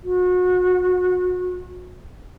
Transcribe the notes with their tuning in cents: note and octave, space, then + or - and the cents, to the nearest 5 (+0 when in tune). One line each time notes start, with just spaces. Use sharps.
F#4 -30